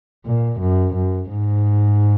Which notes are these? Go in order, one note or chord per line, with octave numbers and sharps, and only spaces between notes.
A#2
F#2
F#2
G#2